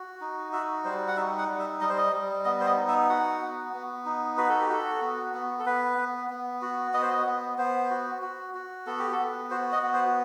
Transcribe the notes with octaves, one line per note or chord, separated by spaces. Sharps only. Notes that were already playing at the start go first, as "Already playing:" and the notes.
Already playing: F#4
D#4
F#4 E5
G3 C5
F#5
D#4 E5
F#5
G3
E5
G3 D#5
C5
D#5
G3
B3 D#5
C5
D#5
D#4
E5
F#4 F#5
B3
B3
D#4
F#4 B4
A4
G4
F#4 A4
B3
B3
A4
B3 B4
B3
B3
F#4
B3 D#5
C5
D#5
B3
B3 C5
F#4
F#4
F#4
B3 A4
G4
A4
B3
F#4 C5
D#5
B3
C5